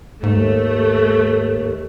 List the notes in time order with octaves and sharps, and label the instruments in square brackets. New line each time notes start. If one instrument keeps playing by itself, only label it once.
[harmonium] D#2 [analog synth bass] G#2 [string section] A3